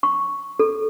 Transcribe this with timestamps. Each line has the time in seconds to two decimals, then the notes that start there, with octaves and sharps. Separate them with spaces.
0.03 C#6
0.60 A4